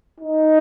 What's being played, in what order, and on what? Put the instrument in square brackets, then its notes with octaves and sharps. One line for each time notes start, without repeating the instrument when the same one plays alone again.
[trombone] D#4